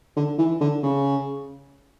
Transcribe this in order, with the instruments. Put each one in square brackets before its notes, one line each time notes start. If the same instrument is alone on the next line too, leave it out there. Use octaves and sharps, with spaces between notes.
[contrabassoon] D3
E3
D3
C#3